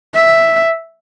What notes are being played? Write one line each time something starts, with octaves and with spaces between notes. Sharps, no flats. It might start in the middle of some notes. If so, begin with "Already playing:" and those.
E5